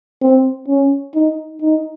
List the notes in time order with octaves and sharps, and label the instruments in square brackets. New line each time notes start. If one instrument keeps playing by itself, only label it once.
[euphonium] C4
C#4
D#4
D#4